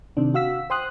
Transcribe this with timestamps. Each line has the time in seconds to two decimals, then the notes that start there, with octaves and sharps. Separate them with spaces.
0.17 C3 D#3 D4
0.34 F#4 F5 E6 B6
0.70 C5 G5 C6 D#6 F#6